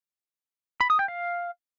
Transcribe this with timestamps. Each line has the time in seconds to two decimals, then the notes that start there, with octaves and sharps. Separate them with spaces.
0.81 B5
0.90 D#6
0.99 G5
1.08 F5